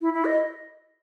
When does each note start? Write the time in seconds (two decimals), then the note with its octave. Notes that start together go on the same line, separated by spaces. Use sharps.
0.01 E4
0.13 E4
0.25 D#5